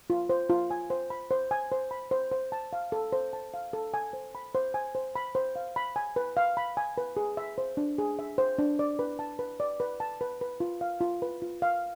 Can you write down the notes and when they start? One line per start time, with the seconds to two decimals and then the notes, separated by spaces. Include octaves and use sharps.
0.10 F4
0.30 C5
0.49 F4
0.71 G#5
0.90 C5
1.10 B5
1.31 C5
1.51 G#5
1.72 C5
1.91 B5
2.11 C5
2.32 C5
2.52 A5
2.73 F5
2.92 A4
3.13 C5
3.33 A5
3.54 F5
3.73 A4
3.94 G#5
4.13 C5
4.35 B5
4.55 C5
4.74 G#5
4.95 C5
5.16 B5
5.35 C5
5.56 F5
5.76 B5
5.96 G#5
6.16 B4
6.37 F5
6.57 B5
6.77 G#5
6.98 B4
7.17 G#4
7.37 E5
7.58 C5
7.77 D4
7.98 G#4
8.19 E5
8.38 C5
8.58 D4
8.79 D5
8.99 B4
9.19 A5
9.39 B4
9.60 D5
9.80 B4
10.00 A5
10.21 B4
10.41 B4
10.60 F4
10.81 F5
11.01 F4
11.22 B4
11.42 F4
11.62 F5